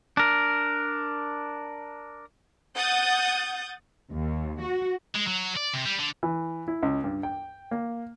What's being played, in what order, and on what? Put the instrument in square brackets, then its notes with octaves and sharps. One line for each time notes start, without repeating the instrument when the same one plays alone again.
[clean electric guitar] D4 A#4
[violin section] F#5 D#6 G6 A6
[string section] D#2
F#4
[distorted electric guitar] G#3
F#3
D5
C3
G3
D3
[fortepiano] E3
E4
C#2
G2
G5
A#3